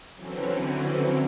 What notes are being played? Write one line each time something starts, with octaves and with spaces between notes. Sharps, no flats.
D3 E3 F#3 C4 C#4